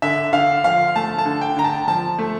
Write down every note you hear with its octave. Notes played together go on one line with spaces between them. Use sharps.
D3 E5
D3 F5
F3 F5
A3 A5
A5
D3
G5
D3 A#5
A5
F3 A5
A3